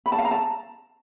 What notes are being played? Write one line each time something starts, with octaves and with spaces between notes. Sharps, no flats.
B5
A5
F5
A#5
A5